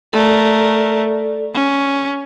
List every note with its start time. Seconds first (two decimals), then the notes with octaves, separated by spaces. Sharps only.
0.13 A3 A4 A#4 D5
1.54 C#4